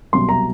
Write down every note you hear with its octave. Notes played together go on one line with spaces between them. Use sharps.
C2 B2 F#3 C6
A#5